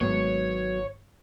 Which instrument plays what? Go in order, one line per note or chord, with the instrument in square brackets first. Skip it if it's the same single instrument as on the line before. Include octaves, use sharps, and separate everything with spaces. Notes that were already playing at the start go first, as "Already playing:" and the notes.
[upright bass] G#1 [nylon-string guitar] F#3 B3 [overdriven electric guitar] C#5